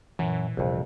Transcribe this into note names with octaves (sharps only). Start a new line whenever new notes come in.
F#2 A#2 E3
A#1 F2 C3 G3